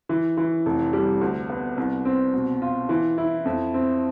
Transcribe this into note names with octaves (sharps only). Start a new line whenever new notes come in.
E3
E3
F1
G3
D2
B3
C2
C4
B2
F4
E3
E4
F2
C4